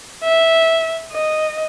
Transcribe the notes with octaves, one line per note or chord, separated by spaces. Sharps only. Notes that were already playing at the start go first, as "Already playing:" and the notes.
E5
D#5